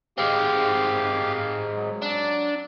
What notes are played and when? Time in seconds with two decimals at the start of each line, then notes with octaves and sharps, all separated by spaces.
0.18 G#3 C4 G4 F5
1.76 F#3
2.02 D4